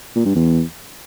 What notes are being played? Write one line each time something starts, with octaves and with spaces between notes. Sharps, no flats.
A#2
G2
E2